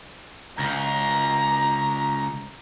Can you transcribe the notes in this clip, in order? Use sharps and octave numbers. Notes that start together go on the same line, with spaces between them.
C#2 A#5